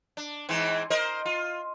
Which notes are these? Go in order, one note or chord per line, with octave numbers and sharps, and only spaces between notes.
D4
G#2 E3 C4
A#4 C5 D#5
F4